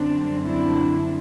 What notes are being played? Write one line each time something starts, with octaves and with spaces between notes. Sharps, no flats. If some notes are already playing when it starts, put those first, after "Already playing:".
Already playing: F#2 D3 G3 C4 D4
D4 E4